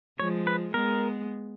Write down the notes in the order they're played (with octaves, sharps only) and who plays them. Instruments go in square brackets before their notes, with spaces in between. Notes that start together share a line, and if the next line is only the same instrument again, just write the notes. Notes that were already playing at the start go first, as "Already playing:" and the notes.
[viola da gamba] F3 G#3 [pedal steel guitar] C#5
[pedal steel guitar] B4
[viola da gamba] G#3 B3 [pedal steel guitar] A#4